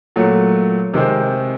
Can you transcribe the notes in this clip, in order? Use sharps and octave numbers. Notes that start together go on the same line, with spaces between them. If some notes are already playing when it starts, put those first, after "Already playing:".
A#2 F#3 A3
C3 D#3 G#3 C4